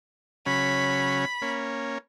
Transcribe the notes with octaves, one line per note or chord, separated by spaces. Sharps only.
C#3 F#3 C#4 B5
A#3 C#4